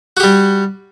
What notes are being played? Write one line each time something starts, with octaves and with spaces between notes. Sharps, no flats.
G3 F#4 G4